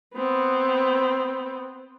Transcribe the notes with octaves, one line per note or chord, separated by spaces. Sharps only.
B3 C4